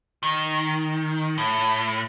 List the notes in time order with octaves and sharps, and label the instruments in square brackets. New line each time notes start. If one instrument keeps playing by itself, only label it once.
[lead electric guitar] D#3
A2